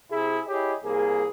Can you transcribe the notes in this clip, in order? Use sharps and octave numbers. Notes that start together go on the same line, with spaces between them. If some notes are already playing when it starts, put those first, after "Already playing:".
C3 E4 G#4
E4 G4 G#4 C#5 D#5
C2 A#3 G#4